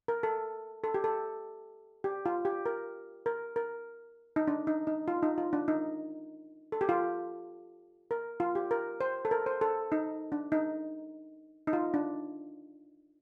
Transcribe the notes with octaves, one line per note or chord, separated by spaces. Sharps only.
A#4
A4
A4
G4
A4
G4
F4
G4
A#4
A#4
A#4
D#4
D4
D#4
D#4
F4
D#4
F4
D4
D#4
A4
G4
F4
A#4
F4
G4
A#4
C5
A4
A#4
C5
A4
D#4
D4
D#4
D#4
F4
D4